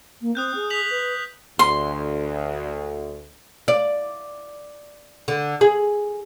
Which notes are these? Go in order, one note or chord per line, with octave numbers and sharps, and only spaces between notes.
A#3
C4 D#6 F#6 G6
G#4
B6 F7 F#7
B4
D2 C6
D5
D3
G#4